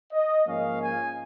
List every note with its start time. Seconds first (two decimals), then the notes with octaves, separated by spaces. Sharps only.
0.12 D#5
0.46 G#2 F3 A#3 C#4 F5
0.81 G#5